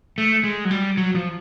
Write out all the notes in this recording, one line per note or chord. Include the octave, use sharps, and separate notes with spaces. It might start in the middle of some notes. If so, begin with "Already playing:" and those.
A3
G#3
F#3
G3
F#3
F3